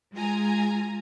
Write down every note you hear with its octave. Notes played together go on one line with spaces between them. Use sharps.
G#3 F4 G#5 A#5